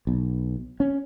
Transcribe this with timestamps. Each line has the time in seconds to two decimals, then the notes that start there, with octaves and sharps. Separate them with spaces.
0.07 B1
0.80 C#4